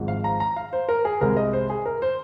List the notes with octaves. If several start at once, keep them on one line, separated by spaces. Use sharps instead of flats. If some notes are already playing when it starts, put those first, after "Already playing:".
Already playing: G#1 G#2 F3
F5
A#5
A#5
F5
C5
A#4
G#4
C2 C3 G#3 A#4
D#5
C5
G#4
A#4
C5